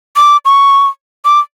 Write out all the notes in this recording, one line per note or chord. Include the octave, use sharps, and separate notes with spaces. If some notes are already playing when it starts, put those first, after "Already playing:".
D6
C#6
D6